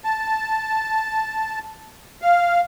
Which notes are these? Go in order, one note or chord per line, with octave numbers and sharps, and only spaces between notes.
A5
F5